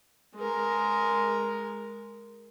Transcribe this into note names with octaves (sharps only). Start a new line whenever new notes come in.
G#3 A#4